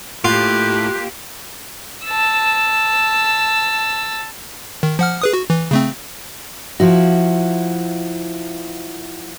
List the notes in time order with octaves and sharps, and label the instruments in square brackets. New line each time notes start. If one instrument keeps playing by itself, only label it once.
[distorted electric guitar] A2 [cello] A#3 G4 [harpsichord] F4 [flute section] F#6 G6
[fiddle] A5 E6
[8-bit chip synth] D#3
F3 F#5 F6
G#4 B4 D#6
F#4
E3
C#3 A3 C4
[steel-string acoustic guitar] F3 E4 F#4